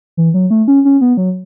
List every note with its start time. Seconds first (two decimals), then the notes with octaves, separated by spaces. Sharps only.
0.17 E3
0.34 F#3
0.50 A3
0.68 C#4
0.85 C#4
1.01 B3
1.17 F#3